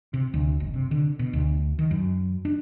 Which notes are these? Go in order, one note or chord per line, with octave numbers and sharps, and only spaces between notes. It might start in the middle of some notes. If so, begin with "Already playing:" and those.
C3
D2
F#1
C3
D3
B2
D2
D#3
F#2
D4